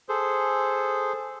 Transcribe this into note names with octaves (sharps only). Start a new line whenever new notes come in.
G#4 A4 C5